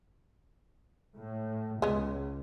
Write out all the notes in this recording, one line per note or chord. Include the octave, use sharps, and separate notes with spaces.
A2
C#2 G#3 B3